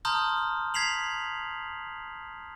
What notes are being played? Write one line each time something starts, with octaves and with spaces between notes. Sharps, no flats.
A5 A#5 C6 D#6 F6 G6
G#6 B6 C7 F7 F#7